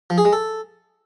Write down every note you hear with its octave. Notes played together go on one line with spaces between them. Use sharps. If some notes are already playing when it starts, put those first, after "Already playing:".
F3
G#4
G#3
A4